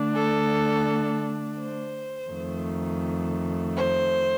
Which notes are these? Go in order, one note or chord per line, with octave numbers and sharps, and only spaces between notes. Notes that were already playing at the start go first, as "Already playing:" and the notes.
Already playing: D3 A3 D4
A4
C5
F2 D#3 A3
C5